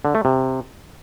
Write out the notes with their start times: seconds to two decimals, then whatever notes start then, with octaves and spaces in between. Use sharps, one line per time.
0.05 D3
0.15 A3
0.25 C3